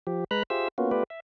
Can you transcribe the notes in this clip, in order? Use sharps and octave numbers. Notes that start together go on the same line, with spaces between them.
F3 G4
G#3 B4 A#5 B5 F#6
F4 G4 G#4 C5 E5 E6
A#3 B3 C#4 F4 F#4
A3 B3 F4 G4 B4 D5
E5